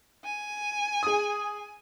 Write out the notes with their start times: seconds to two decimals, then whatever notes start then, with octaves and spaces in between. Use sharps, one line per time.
0.25 G#5
1.03 G#4 D#6